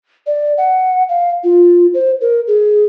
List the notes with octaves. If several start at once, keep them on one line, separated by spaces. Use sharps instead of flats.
D5
F#5
F5
F4
C5
A#4
G#4